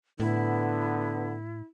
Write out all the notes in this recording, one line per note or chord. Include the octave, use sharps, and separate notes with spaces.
A2 D3 B3 E4